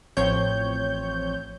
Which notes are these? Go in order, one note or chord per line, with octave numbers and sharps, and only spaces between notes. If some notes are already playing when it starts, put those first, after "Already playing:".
A1 F3 C4 C#5 G6